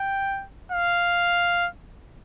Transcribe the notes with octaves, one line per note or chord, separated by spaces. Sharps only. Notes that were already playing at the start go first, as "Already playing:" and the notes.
Already playing: G5
F5